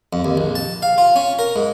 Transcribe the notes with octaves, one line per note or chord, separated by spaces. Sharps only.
F2
D#2
A#1
A5
F5
F4
C#4
A#4
G#2